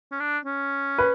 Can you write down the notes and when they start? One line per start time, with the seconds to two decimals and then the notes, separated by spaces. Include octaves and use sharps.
0.12 C#4
0.20 D4
0.45 C#4
0.98 B4